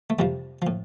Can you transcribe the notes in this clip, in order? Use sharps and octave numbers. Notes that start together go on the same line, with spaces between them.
A3
F2 C3 F3 G3
A2 F3